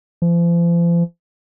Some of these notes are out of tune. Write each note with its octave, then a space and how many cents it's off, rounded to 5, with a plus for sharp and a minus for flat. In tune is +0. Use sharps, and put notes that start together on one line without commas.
F3 -40